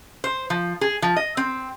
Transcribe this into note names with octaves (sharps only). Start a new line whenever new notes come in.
C5
F3
G#4
F3
D#5
C4